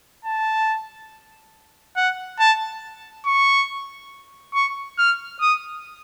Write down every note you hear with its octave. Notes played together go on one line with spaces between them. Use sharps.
A5
F#5
A5
C#6
C#6
F6
D#6